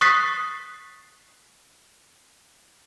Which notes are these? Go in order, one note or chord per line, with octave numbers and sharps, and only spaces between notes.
C#6 D#6 F#6 A6 B6 C7